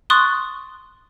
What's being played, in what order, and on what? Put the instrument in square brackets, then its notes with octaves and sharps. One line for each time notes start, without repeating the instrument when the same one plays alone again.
[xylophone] C6 C#6 D#6 F#6 A6